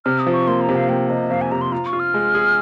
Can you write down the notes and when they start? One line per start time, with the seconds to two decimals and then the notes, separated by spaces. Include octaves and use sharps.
0.05 C3 F6
0.19 D#6
0.26 F3
0.33 C#6
0.47 A#3 C6
0.61 A#5
0.69 C3
0.75 F5
0.89 A#3 G5
1.09 C3 D#5
1.30 F2 F5
1.41 G#5
1.51 C3 A#5
1.61 C6
1.72 F4 A#5
1.86 C#6
1.93 F4
2.00 F6
2.14 G#3
2.35 G#4